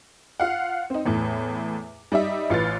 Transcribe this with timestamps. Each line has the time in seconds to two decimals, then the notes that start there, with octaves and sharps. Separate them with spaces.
0.40 F4 F5 F#5
0.90 C4 D#4
1.06 E2 A2
2.12 G3 D#4 D#5 E5
2.50 A1 F4 B4 A6